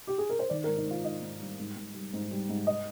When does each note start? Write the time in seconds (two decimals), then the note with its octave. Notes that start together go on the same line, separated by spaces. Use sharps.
0.07 G4
0.18 G#4
0.30 A#4
0.39 C5
0.50 D#3 D5
0.64 A#4
0.68 G#2
0.77 D#4
0.86 G#2 F4
1.04 G#2 D#5
1.22 G#2
1.40 G3
1.59 G#2
1.76 G#2
1.95 G3
2.13 G#2
2.32 G3
2.49 G#2
2.67 D#5